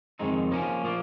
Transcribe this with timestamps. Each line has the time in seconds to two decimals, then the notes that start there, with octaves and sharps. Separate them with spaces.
0.19 F2 D#3 G#3 D#4
0.51 F3 A#3 C#4
0.83 A#2 F3 A#3